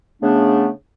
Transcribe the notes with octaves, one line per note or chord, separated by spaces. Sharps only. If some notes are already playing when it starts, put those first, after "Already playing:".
C#3 A3 B3 D4